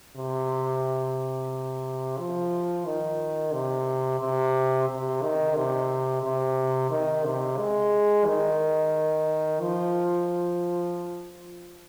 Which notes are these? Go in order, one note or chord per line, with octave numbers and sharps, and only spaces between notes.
C3
F3
D#3
C3
C3
C3
D#3
C3
C3
D#3
C3
G#3
D#3
F3